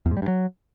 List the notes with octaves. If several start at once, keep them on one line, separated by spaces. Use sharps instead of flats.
E2
G#2
G3
G2
F#3